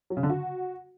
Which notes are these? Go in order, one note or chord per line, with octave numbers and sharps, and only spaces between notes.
F#3
C#3
D3
F#4